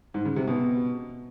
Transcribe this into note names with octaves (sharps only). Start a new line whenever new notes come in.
G#2
C#3
C3
B2